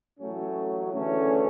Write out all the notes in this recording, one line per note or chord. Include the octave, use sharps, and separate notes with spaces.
A1 A2 F#3 A3 C#4
D2 C#3 E3 A3 C#4